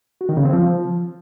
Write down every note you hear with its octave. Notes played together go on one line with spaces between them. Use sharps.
F#4
D#3
C#3
C4
F3